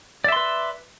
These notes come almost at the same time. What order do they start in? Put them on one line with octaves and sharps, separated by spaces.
D5 E5 C6 B4